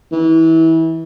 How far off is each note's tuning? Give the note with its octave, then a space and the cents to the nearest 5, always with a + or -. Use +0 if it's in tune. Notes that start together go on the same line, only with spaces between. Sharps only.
E3 -25